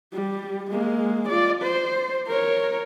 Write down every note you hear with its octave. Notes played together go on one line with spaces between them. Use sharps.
G3
G#3 A#3
F4 D5
C5
A#4 C#5